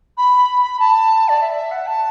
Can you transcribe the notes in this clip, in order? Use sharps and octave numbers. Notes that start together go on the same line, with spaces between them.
B5
B5
A5
D5
E5
E5
F#5
A5